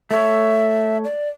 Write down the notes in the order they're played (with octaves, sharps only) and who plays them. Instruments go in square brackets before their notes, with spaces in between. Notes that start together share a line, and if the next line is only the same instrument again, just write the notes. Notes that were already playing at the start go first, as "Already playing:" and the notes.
[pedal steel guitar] A3 C#5 [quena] E5
[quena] D5